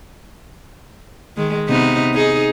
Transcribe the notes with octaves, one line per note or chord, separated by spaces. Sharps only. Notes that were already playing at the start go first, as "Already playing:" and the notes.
D#3 G#3
C3 B3 D#4
D#4 G#4